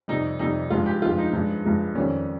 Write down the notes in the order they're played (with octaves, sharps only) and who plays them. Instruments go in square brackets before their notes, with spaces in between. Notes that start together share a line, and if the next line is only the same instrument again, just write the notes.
[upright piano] F2 C3 G3 D#4
F2 C3 G3 D#4
G2 F3 G#3 F4
G4
G2 F3 G#3 F4
D#4
G2 F3 G#3
G2 F3 G#3
F2 D#3 G3 C#4